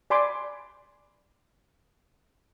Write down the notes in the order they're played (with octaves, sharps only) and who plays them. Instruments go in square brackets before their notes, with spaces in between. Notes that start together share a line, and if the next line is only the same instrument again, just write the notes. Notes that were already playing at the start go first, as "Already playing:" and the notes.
[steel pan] D5 G#5 B5 C6 D6